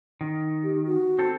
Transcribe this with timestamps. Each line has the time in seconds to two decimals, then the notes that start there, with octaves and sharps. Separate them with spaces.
0.21 D#3
0.63 G4
0.86 F#4
1.19 C4 A4